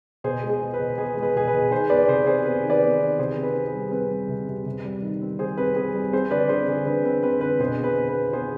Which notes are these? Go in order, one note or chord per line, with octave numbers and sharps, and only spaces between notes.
B2 G#4 C5
G#3
G#4
B3
B4
B2
B3 G#4
G#3
B4
B2 G#4
B4
B2
D#3 G#4 C5
B3 B4 D5
C3 G#4 C5
C3 G#4 C5
B3 B4
D#3
B4 D5
B3
D#3
C3 G#4 C5
C4
B4
C4
G#4
G3
C4 B4
G3
C3
C3
C3
G3
D#3
C4
C3 G#4 C5
C4 B4
C4 G#4
G3
C4 G#4 C5
D3 B4 D5
C4 G#4 C5
D3 G#4
D3 B4
C4 B4
C4 B4
D3 B4
B2 G#4 C5
B3
B4
B3
B4
B3
B3 G#4 C5